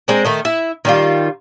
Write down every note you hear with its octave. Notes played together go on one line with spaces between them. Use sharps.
G#3 C4 D4 A#4
D#3 A3 D#5
E4 E5
D#3 G3 F4